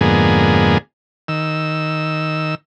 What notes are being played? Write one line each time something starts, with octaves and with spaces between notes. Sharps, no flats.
F2 G#2 D3 A#3 B3 G#4
D#3 E6